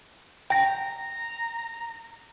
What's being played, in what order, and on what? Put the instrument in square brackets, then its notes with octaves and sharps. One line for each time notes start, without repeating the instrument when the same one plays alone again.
[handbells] G5 A#6 [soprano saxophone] A#5